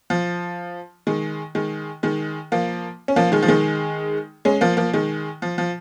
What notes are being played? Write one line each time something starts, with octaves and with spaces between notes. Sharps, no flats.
F3
D#3 G#3
D#3 G#3
D#3 G#3
F3 A#3
C#4
F3 A#3
D#3 G#3
F3
D#3 G#3
G#3 C#4
F3 A#3
F3 A#3
D#3 G#3
F3
F3